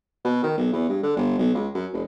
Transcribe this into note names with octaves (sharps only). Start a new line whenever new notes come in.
B2
D#3
B1
E2
G2
D3
G1
B1
C#2
F#2
F1